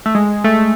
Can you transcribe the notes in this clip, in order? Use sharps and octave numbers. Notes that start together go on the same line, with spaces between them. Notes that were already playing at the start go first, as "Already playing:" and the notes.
A3
G#3
A3